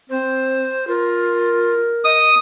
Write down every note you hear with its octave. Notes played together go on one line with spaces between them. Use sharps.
C4 C5
F4 A#4
D#5 D#6